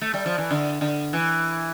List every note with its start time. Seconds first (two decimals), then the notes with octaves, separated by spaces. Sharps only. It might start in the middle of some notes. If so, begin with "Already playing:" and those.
0.01 A3
0.14 G3
0.26 F3
0.38 E3
0.51 D3
0.81 D3
1.13 E3